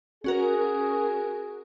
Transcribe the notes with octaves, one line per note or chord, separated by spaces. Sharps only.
C#4 F#4 G#4 A#4